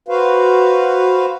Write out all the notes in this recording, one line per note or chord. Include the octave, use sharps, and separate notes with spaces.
F#4 B4 C5 F5